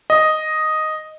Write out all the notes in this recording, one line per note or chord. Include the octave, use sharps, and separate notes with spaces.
D#5